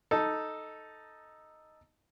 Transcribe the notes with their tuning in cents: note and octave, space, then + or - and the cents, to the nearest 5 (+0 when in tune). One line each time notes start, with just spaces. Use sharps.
D#4 +0 A4 +0